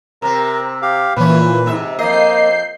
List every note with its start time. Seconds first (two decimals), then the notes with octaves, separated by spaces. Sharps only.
0.22 C3 C4 A#4
0.82 G4 F5
1.16 A#2 E3 F3 C#4 B4
1.66 G#2 C3 E5
1.99 F2 A#3 D#5 G6 C7